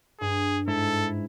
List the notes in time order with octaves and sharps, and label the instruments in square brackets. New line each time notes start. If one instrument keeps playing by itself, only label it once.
[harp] G2 [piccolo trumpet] G#4
[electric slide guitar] G#2 E4 [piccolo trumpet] A4